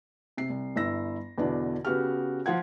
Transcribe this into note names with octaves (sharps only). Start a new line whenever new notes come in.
C3 C7
C2
G1 E4 E6 A#6
E2 B2 D3 D4 E4
C#3 B3 F#4 G4 F6
F3 F4 F#5 G#6